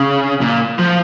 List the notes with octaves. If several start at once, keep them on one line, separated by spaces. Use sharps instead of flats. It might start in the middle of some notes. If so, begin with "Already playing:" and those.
Already playing: C#3
A#2
F3